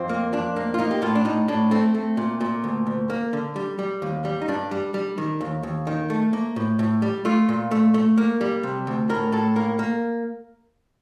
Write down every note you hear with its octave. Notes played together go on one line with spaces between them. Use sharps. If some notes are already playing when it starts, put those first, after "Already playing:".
Already playing: F2 C4
A#3
F2 D4
A#3
F4
A#3 D#4
G4
A2 F4
D4
A2 D#4
A2 D4
A3 C4
A3
A#2
A#2
D2
D2
A#3
D3
G3
G3
D#2
G3
D#4
G2 D4
G3
G3
D#3
D#2
D#2
D#3
A3
A#3
A2
A2
G3
A3 F4
A#2
A3
A3
A#3
G3
C3
D2
A2 A#4
A2 A4
A#3 A#4
A#3